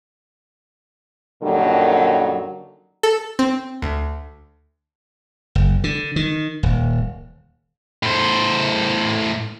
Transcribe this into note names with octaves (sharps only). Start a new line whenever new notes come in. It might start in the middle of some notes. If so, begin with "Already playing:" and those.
F#2 A#2 D3 D#3 F#3 G3
A4
C4
D2
F#1
D3
D#3
D#1
A2 C5